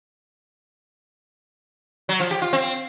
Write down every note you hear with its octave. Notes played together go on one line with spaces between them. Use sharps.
F#3
F3
G4
F4
C4